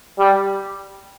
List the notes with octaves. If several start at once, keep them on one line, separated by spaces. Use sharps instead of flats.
G3